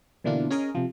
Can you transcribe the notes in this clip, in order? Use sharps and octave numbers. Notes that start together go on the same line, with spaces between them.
B2 D3 E3 A#3 D4 F4
C#4 G#4 A#4 D#5
C3 F3